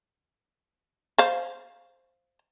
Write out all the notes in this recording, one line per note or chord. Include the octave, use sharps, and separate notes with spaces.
C5 F5